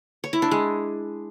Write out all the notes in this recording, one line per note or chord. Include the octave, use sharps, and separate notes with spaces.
C#5
E4
D4
G#3